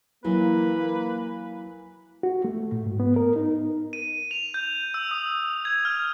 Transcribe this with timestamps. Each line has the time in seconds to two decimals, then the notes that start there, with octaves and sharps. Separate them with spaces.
0.25 E3 F#3 A#3 B4
2.23 F#4
2.45 A3
2.72 A2
2.86 G#2
3.00 B3
3.16 A#4
3.36 D#4
3.93 D#7
4.31 F7
4.54 G6
4.94 E6
5.11 D#6
5.65 G#6
5.85 F6